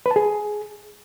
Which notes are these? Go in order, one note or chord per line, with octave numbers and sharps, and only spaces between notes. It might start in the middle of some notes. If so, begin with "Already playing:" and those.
B4
A5
G#4